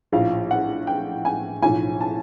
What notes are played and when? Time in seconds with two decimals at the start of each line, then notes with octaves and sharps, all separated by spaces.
0.12 A#1 A2 F3 F5
0.51 F#5
0.87 G5
1.25 G#5
1.62 B1 A2 F3 G#5
2.01 A5